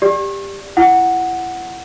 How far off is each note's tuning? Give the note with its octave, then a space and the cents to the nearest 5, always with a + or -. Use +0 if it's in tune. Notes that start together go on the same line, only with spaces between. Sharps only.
G4 +15 D5 +0
E4 +30 F#5 +0